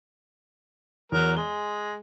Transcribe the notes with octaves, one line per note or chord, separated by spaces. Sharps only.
E2 F#3 A#4
G#3 G7